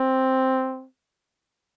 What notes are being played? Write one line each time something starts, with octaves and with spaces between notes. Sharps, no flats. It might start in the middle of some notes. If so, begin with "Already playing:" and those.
Already playing: C4